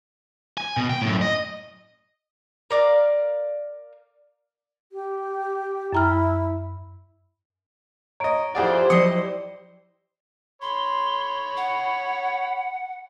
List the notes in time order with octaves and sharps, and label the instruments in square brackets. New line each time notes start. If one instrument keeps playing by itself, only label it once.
[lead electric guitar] G#5
B2
G5
F#2 A2
D#5
[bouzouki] A#4 D5 F5
[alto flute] G4
[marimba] F#2 A#5 F6 [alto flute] E4
[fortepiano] C#5 D#5 [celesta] A#5 D7
[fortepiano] F2 G#4 D5 [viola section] E4 G4 C5 [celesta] F#5
[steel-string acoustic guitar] F3 F#3 D#5 [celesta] D5 C7 C#7 [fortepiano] D#6
[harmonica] C#5 B5 [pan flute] C6
[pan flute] F#5